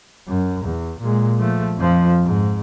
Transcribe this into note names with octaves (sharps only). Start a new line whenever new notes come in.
F#2
E2
A#2 G#3
F3 A3
F2 F3
G#2